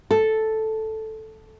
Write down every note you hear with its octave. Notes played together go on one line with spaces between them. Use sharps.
A4